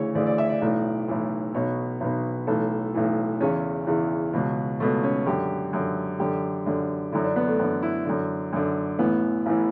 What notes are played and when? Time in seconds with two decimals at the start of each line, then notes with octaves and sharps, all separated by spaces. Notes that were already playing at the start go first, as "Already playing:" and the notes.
Already playing: D2 C#3 E3 C#5
0.15 D2 C#3 E3 D5
0.26 D5
0.38 E5
0.49 D5
0.61 B1 A2 E3
1.08 B1 A2 E3
1.54 B1 B2 C#5
2.01 B1 B2
2.47 B1 A2 E3 A4
2.94 B1 A2 E3
3.40 E2 C#3 E3 C#4
3.87 E2 C#3 E3
4.33 C#2 B2
4.80 C#2 B2 A3
5.03 C#4
5.26 F#2 D3 G4
5.73 F#2 D3
6.20 F#2 D3 G4
6.66 F#2 D3
7.12 F#2 D3 E4
7.24 D4
7.36 B3
7.48 A3
7.59 F#2 D3 B3
7.82 E4
8.05 F#2 D3
8.53 F#2 D3
8.98 A1 A2 E3 B3
9.46 A1 A2 E3